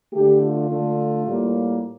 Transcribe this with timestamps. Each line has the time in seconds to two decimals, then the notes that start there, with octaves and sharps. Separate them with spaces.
0.13 D3 A3 G4
0.41 F4
0.69 D3 A3
1.25 A2 G3 A#3